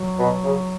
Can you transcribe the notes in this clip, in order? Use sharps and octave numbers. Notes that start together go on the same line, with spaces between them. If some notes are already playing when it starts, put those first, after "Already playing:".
Already playing: F#3
B2
C#3